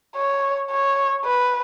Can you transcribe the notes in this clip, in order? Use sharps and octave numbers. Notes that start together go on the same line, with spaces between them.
C#5
C#5
B4